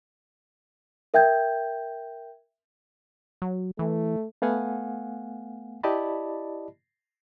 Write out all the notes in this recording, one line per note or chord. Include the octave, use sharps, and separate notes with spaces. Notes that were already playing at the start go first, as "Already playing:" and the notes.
A#4 E5 G5 G6 G#6
F#3
E3 A3
A3 B3 F5 F#5 G#5
E4 G4 D5 D#5 A5 B5